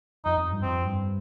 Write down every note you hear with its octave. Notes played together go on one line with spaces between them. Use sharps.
F2 D#4
F2
G2
F2 C4
G2